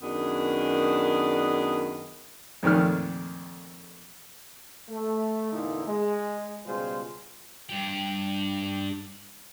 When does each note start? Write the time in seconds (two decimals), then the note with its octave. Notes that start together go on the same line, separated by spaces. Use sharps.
0.02 F#2 D#3 B3 D4 G#4
2.63 F2 A#2 D#3 A3 F6
4.89 A3
5.52 E2 A#2 D3 D#4 E4
5.87 G#3
6.66 C#2 B2 G3 F4 G#4 C5
7.69 G2 G4